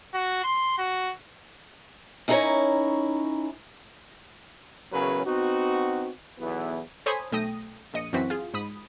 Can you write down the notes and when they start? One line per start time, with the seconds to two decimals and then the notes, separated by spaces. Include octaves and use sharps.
0.14 F#4
0.44 C6
0.78 F#4
2.28 C#4 D#4 E4 G#4 A#4 C#5
4.91 E2 C#3 F#3 C#4 A#4 B4
5.25 B3 C4 D#4 F#4
6.39 B1 E2 B3 E4
7.06 A4 C5 C#5 G#5 B5 D#6
7.32 B1 A3 G5 D#6 A#6 D#7
7.94 A#1 D#5 C#7 D#7
8.13 F#2 E3 C4 F#4 B6
8.30 F4 G#4
8.54 G#2 B5 D#6